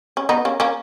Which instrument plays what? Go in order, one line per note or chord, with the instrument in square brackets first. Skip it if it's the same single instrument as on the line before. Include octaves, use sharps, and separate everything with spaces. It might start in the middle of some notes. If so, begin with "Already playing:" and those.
[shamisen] C#4
B3 D#4
A#3 C#4
A#3 C#4